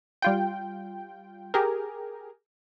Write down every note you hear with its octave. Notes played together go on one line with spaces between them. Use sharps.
G3 F4 G5
G4 G#4 A#4